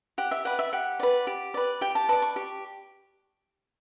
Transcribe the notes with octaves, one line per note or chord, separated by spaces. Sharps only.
G4 F#5
E5
B4 D5 F#5
E5
G4 F#5
B4 D5
G4
B4 D5
G4 G5
A5
B4 D5 A5
C#6
G4